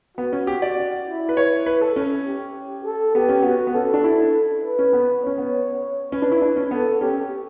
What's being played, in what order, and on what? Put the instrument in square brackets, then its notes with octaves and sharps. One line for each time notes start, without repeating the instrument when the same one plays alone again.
[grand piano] B3 [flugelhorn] F#4
[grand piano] C#4
G4
D5
[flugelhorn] E4
[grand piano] B4
[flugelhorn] E4 [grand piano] C#5
[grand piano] B4
A4
C#4
[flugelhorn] G4
A4
[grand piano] B3 [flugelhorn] G4
[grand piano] C#4
[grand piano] B3 [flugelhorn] F#4
[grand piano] B3
[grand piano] C#4 [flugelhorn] A4
[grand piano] D4
E4
[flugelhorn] B4
[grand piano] C#4
B3
[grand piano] C#4 [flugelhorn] C#5
[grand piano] B3
[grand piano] C#4 [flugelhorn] B4
[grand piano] D4
E4
D4
C#4
[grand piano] B3 [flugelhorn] A4
[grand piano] C#4 [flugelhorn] G4